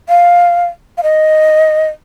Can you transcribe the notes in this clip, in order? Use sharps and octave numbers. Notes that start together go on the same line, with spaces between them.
F5
F5
D#5